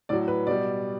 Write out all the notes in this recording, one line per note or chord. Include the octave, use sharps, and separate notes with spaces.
A2 F#3 D5
B4
B2 G3 D5